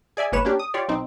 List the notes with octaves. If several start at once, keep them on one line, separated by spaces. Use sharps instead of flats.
G#4 D5 E5 G#5
G1 G#2 A#3 B4 C#5 E7
A#3 C#4 D4 G4
D#6
F4 G4 C#5 D5
B1 C4 D#4